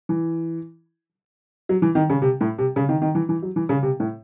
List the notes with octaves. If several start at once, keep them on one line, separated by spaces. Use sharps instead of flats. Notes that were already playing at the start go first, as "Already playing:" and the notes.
E3
F#3
E3
D#3
C#3
C3
A2
C3
C#3
D#3
D#3
E3
E3
F#3
E3
C#3
C3
A2